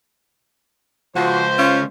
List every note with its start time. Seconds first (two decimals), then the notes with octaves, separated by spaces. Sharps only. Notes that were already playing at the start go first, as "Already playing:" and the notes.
1.16 C#2 F3 F#4 C5
1.58 C#4 F4